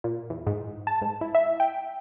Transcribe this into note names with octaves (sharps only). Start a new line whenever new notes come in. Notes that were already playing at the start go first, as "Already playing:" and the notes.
A#2
E2
G#2
A5
G#2
E4
E5
G5